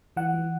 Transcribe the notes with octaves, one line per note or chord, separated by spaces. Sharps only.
E3 F#5
E3